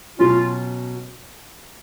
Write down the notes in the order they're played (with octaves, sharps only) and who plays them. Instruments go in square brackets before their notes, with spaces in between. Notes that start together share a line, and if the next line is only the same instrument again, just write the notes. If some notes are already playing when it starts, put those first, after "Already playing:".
[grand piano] B2 F#3 C#4 [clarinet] F4